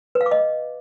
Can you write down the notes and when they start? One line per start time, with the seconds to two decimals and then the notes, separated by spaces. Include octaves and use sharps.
0.15 B4
0.21 F5
0.26 D6
0.31 D#5